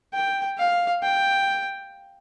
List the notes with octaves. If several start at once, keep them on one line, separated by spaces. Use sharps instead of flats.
G5
F5
G5